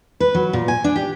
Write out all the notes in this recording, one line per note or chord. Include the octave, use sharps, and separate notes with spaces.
B4
F#3
A#2
G#5
D4
G4